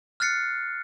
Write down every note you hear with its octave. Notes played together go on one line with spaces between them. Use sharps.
F6 F#6 A6 C7 C#7